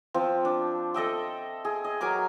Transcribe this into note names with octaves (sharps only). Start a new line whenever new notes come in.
F3 C4
D4
A4 D#5 E5 G5
G#4
D#5
F#3 A#4 G#5 D6